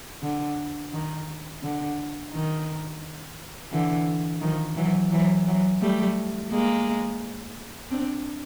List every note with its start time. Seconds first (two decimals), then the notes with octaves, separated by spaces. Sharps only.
0.22 D3
0.92 D#3
1.63 D3
2.33 D#3
3.72 D3 E3
4.41 D#3 F3
4.76 E3 F#3
5.11 E3 F#3
5.47 E3 F#3
5.81 G3 A3
6.51 G#3 A#3
7.90 C4 D4